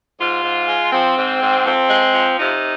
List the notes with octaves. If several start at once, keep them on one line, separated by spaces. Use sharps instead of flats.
G#2 F4
G#2
G#3
F3 C4
G#2
G#2
F2 C4
G#3
F3
C3 D#4